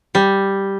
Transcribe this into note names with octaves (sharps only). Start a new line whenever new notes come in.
G3